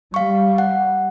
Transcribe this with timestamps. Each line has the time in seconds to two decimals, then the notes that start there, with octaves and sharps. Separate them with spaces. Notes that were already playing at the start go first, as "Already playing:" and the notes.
0.14 G3 F5 C#6
0.58 F#5